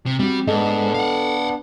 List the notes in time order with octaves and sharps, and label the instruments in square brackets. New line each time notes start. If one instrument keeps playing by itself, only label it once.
[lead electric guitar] C3
[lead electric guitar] G3 [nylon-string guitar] C4 F#4
[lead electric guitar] G#2 [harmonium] B3 D4 [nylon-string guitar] A4 D#5
[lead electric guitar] F5 F#5